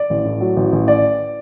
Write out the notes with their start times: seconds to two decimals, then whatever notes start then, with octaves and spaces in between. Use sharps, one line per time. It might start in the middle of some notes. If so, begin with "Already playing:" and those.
Already playing: D5
0.10 A1
0.25 A2
0.41 F#3
0.56 A1
0.72 A1
0.88 D5